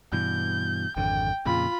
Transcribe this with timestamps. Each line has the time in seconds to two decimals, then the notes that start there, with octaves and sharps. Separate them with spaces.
0.12 G2 B2 E3 G6
0.97 G#1 F2 D3 G5
1.46 F2 A#2 C#3 F4 B5